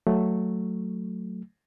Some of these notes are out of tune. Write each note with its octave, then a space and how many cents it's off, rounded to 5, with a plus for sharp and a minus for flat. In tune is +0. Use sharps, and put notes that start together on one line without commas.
F#3 +0 A3 +5